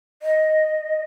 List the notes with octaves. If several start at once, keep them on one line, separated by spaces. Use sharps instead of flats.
D#5